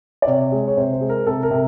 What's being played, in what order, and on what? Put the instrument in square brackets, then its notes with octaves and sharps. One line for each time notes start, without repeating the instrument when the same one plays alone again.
[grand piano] D5
C3 C#5
G#3
C#5
C3 C5
C5
G#3
A#4
C3 A4
A#4
C3